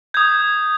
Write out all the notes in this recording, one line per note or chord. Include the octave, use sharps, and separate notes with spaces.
D#6 G6 G#6